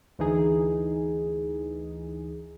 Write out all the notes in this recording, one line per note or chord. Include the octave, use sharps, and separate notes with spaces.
D2 E3 D#4 G#4